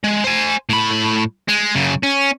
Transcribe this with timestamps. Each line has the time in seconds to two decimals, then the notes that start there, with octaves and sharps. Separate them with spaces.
0.04 G#3
0.24 C5 G#5
0.69 A2 B5
1.49 G#3
1.75 F#2 C#3
2.03 C#4